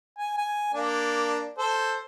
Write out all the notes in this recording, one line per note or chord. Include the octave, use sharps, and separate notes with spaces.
G#5
G#5
A#3 D4
A4 C5